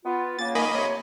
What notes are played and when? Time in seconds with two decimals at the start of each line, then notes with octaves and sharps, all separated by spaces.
0.05 B3 F4
0.39 C#3 A#3 A6
0.55 D#3 A#3 D#5 G#5 B5
0.74 C3 C#5